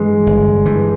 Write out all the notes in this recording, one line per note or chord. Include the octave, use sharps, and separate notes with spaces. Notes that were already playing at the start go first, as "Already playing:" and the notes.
Already playing: G2 E3 G#3
G1
G2 E3